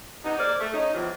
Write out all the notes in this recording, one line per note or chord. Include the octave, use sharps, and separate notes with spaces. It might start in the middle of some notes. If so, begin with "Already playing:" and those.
C3 B3 D#4
A#3 G#4 A#4 C5 D5
A3
C#4 D#4
E2 A2 C3 F3